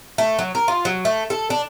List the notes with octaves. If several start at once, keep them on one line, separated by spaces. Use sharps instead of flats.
A3
F#3
A#4
F4
F#3
A3
A4
D4